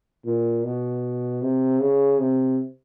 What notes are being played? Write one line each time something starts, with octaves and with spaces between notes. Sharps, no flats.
A#2
B2
C3
C#3
C3